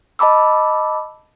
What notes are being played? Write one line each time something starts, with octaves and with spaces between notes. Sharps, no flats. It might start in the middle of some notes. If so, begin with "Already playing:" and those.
D#5 A5 B5 D6 E6